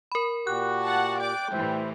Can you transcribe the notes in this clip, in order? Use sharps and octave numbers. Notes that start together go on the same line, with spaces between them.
A#4 B5
A#2 F#4 G4 F#6
F#5 A5
D5 G5 D6
A2 E3 G3 C5 E5